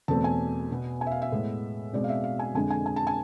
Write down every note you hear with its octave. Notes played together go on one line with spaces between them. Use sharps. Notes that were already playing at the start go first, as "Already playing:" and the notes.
E2 B2 A3 C4 A5
G#5
B2 B3
G#5
E5
F5
E5
A2 G#3 B3
B2 G#3 C4 D5
F5
E5
F5
G#5
F2 D3 G#3 G#5
G#5
G#5
A5
G#5